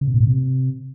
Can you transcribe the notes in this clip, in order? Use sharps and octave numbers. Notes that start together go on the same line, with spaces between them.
C#3
B2
A#2
A2
C3